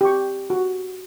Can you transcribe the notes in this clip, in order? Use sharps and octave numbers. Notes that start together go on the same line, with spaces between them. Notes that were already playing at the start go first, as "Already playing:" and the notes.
G4 C#6
F#4